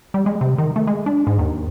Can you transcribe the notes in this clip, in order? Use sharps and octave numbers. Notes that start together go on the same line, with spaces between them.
G3
G#3
C3
D#3
A3
G#3
D4
G#2
D#2